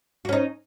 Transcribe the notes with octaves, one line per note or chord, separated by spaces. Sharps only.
C#4 D#4 F#4